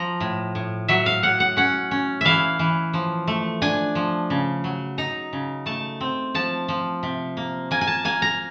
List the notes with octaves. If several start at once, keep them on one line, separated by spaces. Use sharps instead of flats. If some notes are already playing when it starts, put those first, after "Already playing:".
Already playing: F3 A#5
A2
A2
F#3 E5
F5
A2 F#5
F#5
C#4 F#5
C#4
E3 E5 F5
E3
F3
A3
D4 G#5
F3
C#3
F#3
D#4 A#5
C#3
A3 A5
C4
F3 A5
F3
C3
A#3
A#3 G#5
G#5
A5
A#3 G#5
A#5